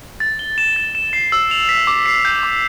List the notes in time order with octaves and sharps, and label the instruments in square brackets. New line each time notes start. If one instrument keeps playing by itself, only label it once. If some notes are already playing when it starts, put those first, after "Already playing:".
[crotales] A6
G7
E7
A6
E7
C7
E6
F7
B6
D6
C7
G6
D6